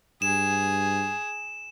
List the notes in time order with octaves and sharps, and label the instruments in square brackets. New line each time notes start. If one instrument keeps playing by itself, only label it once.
[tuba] G2 [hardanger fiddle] G#4 [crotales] E7